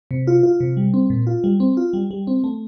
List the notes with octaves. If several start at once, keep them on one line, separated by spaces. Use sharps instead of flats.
C3
F4
F4
C3
G3
C4
A#2
F4
G3
C4
F4
G3
G3
C4
A3